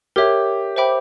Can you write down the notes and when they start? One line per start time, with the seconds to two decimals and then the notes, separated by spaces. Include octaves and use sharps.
0.16 G4 A#4 C#5 E5
0.76 C5 E5 G5 B5 D6